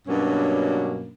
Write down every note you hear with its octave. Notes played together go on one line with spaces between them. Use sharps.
G2 B2 F#3 A#3 C#4 D4